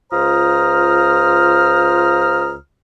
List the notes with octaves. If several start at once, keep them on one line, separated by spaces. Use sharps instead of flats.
C#2 F4 C5 A#5 D#6 F6